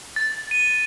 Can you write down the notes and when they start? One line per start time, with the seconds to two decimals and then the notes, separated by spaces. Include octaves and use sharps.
0.16 A6
0.51 D#7